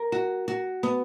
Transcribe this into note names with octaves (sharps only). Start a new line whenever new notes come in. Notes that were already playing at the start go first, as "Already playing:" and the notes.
Already playing: A#4
F#4
F#4
B3